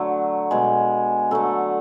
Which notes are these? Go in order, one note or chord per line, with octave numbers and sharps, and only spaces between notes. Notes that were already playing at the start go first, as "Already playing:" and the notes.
Already playing: D3 F#3 A3
B2 G#3
D3 F#3 A3 A4